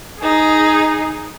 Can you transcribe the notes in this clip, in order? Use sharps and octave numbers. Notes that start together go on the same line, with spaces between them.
D#4 G#4